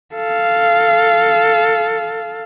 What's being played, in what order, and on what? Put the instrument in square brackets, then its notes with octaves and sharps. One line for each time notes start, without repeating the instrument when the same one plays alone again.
[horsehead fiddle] A4 F5